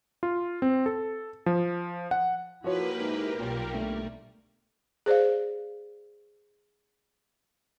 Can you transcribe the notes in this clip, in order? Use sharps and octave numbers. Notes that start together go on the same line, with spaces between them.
F4
C4
A4
F3
F#5
F3 A#3 E4 F#4 G4 A#4 B4 C#5
G#2
B1 A#2 G3
G1 A3
G#4 C5 D5 F5